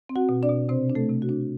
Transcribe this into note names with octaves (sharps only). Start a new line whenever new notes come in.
C4
F#4 F#5
B2
D4 D5
B2
C3 C4 C5
D4
A3 A4
C3
F#4
D4